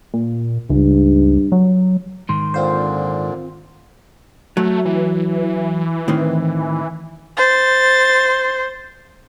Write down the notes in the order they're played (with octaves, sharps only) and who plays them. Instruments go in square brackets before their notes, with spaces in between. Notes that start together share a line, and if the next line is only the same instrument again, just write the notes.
[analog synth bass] A#2
[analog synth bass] C#2 [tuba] G2
[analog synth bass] F#3
[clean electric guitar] G#2 D#3 [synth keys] C6
[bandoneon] A#2 D3 [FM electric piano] C4 F4 C5
[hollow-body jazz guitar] F#3 [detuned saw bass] A3
[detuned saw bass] E3
[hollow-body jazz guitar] A2 D#3 C4
[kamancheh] C5 [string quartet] A6